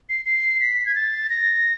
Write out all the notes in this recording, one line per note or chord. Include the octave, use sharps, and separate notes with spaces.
C7
C7
B6
G#6
A6
A#6